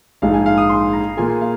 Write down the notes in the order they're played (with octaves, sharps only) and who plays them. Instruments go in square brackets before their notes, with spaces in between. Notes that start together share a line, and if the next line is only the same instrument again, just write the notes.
[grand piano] A#1 G#2 G#3 D#4 G#4 [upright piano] F5
[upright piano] G#5
F5
D#6
C6
A#5
[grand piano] A#2 A#3 F4 G#4 [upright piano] G#5
[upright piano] F5